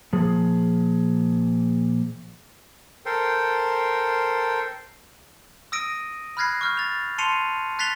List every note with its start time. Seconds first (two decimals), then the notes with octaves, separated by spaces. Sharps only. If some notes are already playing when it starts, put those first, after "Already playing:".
0.13 A#2 F3 G#4
3.06 A4 A#4 C5 G5
5.72 D#6 E6 A#6 D7 D#7
6.37 B5 F6 F#6 G#6 A#6 C7
6.61 C#6 F6 G6
6.77 A6 F7
7.18 A5 C6 C7 C#7 D#7 F7
7.79 F#6 A6 B6 C7 F7 G7